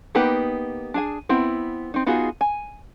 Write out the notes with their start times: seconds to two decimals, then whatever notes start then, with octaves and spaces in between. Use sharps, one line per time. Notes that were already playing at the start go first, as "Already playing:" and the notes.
0.15 A#3 B3 D#4 G4 B4
0.94 D4 G#4 G#5
1.29 B3 C4 E4
1.94 C4 D#4
2.06 B3 D#4 F4 F#4 G#4
2.41 G#5